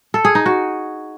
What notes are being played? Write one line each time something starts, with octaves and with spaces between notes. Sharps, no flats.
A4
G#4
D#4
F#4